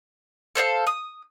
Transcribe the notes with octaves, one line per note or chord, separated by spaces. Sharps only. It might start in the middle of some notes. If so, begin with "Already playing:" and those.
A4 C5 D5 F5
D#6